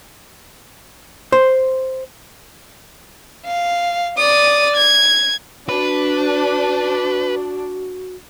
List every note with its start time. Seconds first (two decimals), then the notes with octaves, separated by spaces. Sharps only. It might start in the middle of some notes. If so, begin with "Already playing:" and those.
1.32 C5
3.46 F5
4.18 D5 D#6
4.76 G#6
5.69 D4 F#4 B4